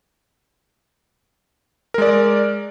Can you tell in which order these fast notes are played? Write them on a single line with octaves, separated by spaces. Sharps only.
A#4 G#3 D5